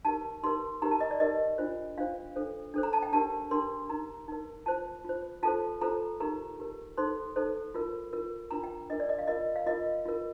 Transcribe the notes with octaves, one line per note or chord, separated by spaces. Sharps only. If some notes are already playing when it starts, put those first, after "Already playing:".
D#4 G4 A#4 A5
D#4 G4 A#4 C6
D#4 G4 A#4 A#5
A5
D#5
D5
D#4 G4 A#4 D#5
D4 F4 C5
D4 F4 C5 F5
D4 A4 C5
D4 A4 C5
A#5
A5
G5
D4 G4 A#4 A5
D4 G4 A#4 C6
D#4 A#4 A#5
D#4 A#4
F4 C5 A5
F4 C5
F4 A4 C5 A5
F4 A4 C5 A#5
D#4 G4 A#4 A#5
D#4 G4 A#4
D#4 A4 C5 C6
D#4 A4 C5
F4 A#4
F4 A#4
D4 F4 A#4 A#5
G5
D4 F4 A#4 D#5
D5
D#5
F5
F4 A#4 D#5
F5
F4 A#4 D#5
F4 A#4